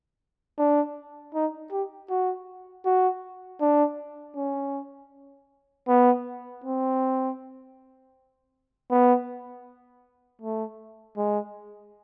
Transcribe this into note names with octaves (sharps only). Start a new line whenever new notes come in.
D4
D#4
G4
F#4
F#4
D4
C#4
B3
C4
B3
A3
G#3